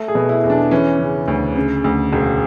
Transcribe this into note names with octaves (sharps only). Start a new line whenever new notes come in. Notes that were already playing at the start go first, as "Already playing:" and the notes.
Already playing: A3
G#4
B2
E4
E2
D4
E3 C#4
C#3
D2
C#3
D2
E1